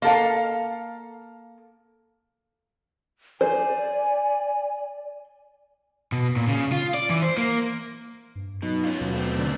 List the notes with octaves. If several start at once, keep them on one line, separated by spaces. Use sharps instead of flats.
A#3 A4 F5
C5 D5 G#5
B2
A#2
C#3
F4
D5
E3
C5
A#3
G2
B2 F#3 D#4
C#4 F4
D#2 B2 F#3
A3 C4
D3